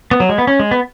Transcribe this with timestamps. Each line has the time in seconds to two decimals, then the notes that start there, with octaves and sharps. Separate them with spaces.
0.11 B3
0.20 F#3
0.29 G#3
0.38 B3
0.47 C#4
0.60 G#3
0.71 B3